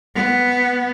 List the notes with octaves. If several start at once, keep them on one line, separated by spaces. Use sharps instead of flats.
B3